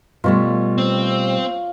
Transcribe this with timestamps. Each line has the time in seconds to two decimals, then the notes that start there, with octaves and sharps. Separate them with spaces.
0.24 B2 G3 A3 F4 C#5
0.78 C4